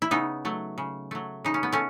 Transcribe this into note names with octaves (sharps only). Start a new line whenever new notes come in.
E4
C#3 B3 D#4
F#3 A3
C#3
F#3 A3
C#3 D#4
C#4
B3
A3 C#4